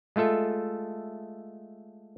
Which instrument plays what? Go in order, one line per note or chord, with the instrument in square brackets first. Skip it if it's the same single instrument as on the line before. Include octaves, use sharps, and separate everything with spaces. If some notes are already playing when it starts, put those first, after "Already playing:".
[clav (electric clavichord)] G#3 A3 F4 A4 E5